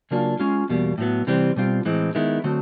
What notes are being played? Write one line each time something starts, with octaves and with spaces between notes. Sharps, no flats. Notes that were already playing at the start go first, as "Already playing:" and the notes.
C#3 F#3 A#3 D4 F4
G#3 C#4 F4
E2 B2 G3 A#3
A2 F#3 B3
C3 E3 G3 C4
B2 G3 C4 F4
A2 E3 G#3 C4
D#3 G#3 B3 E4
D3 F#3 A3 C4